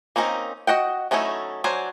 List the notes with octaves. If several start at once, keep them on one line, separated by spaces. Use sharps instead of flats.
A#3 C4 C#4 D#4 A#4
F#4 D#5 F#5 G5
F#3 A3 C#4 D#4 E4
F#3 D4 C5 G#5